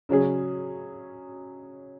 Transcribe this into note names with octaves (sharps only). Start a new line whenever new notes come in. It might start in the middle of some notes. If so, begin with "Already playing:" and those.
C#3 F#3 C#4 G#4